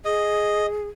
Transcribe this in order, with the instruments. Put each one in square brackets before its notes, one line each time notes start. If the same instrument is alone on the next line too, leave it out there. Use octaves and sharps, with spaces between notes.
[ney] G#4 [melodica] D#5